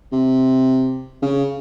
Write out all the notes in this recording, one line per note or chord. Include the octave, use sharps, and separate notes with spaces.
C3
C#3